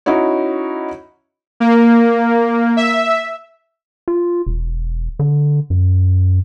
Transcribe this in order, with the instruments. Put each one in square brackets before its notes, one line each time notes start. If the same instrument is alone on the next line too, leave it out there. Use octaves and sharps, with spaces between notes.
[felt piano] C#4 D#4 E4 F#4 C#5
[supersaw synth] A#3
E5
[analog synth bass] F4
E1
D3
F#2